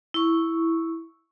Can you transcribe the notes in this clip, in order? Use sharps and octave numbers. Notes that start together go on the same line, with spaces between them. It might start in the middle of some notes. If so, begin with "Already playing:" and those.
E4 C#6